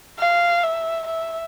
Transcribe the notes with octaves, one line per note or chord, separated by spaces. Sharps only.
F5
E5
E5